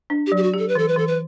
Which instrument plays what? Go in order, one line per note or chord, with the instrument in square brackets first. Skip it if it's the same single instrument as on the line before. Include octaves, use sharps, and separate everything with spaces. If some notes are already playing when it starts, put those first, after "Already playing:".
[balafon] D4
[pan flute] G4
[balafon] F#3
[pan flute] G4
F#4
[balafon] G4
[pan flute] A4
B4
[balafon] E3 [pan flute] A4
[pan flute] B4
[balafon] E3 [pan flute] A4
[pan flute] B4